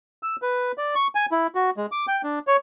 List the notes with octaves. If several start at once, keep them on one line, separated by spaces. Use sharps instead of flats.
E6
B4
D5
C#6
G#5
E4
F#4
G#3
D6
G5
D4
C#5